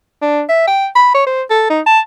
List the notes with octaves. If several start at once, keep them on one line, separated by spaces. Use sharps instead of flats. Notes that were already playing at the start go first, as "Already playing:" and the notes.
D4
E5
G5
B5
C#5
C5
A4
D#4
A5